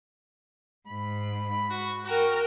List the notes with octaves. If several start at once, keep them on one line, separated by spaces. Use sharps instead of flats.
G#2 B5
F#4
F#4 A#4 G5 A#5